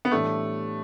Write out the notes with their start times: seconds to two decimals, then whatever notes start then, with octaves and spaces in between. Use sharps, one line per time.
0.05 B3
0.11 A2 E3 G3 A3 D4 G4